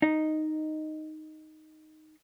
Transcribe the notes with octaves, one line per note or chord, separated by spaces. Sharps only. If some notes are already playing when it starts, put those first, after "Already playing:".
D#4 D#5